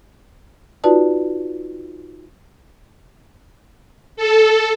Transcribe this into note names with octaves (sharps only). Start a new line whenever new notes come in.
D#4 F4 F#4 B4 D5 A5
A4